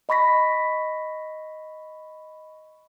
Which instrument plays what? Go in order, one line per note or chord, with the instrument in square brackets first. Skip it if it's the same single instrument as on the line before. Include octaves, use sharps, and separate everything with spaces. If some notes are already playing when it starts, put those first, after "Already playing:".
[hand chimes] D#5 B5 C#6 A#6 B6